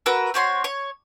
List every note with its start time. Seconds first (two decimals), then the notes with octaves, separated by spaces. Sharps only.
0.06 F#4 A#4 B4 E6
0.34 C4 F#4 C#5 C6
0.64 C#5